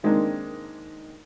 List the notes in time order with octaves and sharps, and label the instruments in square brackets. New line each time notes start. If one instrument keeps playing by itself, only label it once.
[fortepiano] D#3 G#3 A#3 C4 D4 D#4